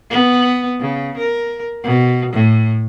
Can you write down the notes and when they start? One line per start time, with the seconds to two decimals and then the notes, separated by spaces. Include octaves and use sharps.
0.10 B3
0.80 C#3
1.17 A#4
1.83 B2
2.33 A2